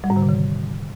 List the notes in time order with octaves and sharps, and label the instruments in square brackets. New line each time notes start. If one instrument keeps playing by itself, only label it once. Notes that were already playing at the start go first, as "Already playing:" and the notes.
[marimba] G3
G#2
D3
C3
D#3